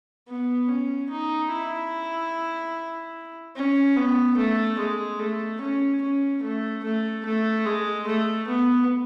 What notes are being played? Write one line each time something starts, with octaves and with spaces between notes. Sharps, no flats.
B3
C#4
D#4
E4
C#4
B3
A3
G#3
A3
C#4
C#4
A3
A3
A3
G#3
A3
B3